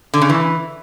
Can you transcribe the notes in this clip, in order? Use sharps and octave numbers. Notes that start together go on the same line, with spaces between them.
D3
C#3
E3